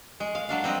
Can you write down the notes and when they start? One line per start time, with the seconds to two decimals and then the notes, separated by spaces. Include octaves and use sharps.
0.20 G#3
0.35 F5
0.49 F#3 D4 F5
0.64 G3 C4 B4 D#5